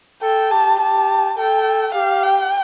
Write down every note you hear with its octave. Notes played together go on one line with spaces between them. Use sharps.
A4 G5
G4 A5
G4 A5
A4 G5
G4 F5
G5